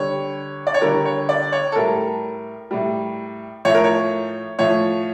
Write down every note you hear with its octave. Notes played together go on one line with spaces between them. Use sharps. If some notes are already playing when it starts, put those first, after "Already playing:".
Already playing: D3 G3 C#5
D5
C#5
D3 G3 A#4
C#5
D5
C#5
A4
A2 G3 A#4
A2 G3
A2 F3 A3 C#5
A#4
C#5
A2 F3 A3 C#5